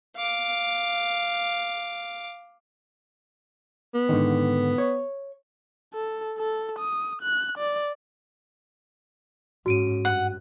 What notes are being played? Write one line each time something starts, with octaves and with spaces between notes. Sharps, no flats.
F5 D6
B3
G#2 D3 D#3
C#5
A4
A4
D#6
F#6
D5
G#2 C#4 F#4 D7 D#7
G2 F#5